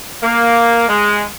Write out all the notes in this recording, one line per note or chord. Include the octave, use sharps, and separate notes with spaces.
A#3
G#3